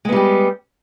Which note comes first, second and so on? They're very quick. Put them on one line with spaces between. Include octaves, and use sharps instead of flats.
G#3 B3 G3 G4